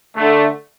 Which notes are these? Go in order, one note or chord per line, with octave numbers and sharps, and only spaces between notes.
D3 A3